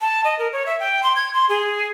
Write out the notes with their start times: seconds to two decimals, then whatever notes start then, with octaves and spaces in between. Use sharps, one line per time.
0.01 A5
0.24 D#5
0.39 A#4
0.53 C#5
0.66 E5
0.80 G5
1.03 C6
1.16 G#6
1.34 C6
1.49 G#4